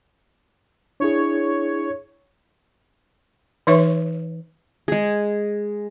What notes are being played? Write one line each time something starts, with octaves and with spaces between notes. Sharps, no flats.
D4 E4 G#4 C#5
E3 D#4 B4 C#5 E5 C#6
G#3 G#4